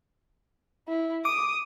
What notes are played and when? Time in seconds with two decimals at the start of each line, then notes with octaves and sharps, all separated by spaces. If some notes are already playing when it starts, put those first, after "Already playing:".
0.88 E4
1.25 D6 D#6